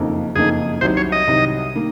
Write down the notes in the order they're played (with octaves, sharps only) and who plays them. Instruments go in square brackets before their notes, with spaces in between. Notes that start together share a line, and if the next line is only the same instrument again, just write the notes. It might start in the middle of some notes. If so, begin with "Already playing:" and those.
Already playing: [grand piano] F#1 F2 D#3 A#3 D#4
[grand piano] F#1 F2 D#3 A#3 D#4 [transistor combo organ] G#4
[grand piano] C2 C3 D#3 F#3 [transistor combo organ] C5
[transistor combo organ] C#5
D#5
[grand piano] C2 C3 D#3 F#3
D#3 A#3